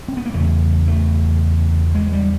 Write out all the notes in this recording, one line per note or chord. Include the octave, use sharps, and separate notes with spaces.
C4
B3
A#3
E2 C#3 A3
A3
G#3
G3